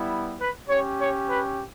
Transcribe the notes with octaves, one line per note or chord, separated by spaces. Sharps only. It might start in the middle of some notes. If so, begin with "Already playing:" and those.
Already playing: G3 B3 E4
B4
C#4 G4 C#5
C#5
B4